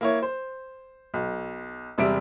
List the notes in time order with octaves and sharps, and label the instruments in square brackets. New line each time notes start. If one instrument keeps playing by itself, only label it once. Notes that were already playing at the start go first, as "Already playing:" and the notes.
[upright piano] A#3 E4 C#5
C5
B1
E1 C3 G3 E5 D7